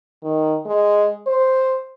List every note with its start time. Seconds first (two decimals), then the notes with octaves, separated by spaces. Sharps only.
0.23 D#3
0.65 G#3
1.27 C5